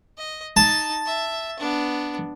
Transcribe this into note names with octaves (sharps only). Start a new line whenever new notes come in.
D#5
D#4 A5
E5
B3 D4